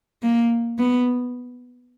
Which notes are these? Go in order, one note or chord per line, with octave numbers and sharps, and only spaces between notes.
A#3
B3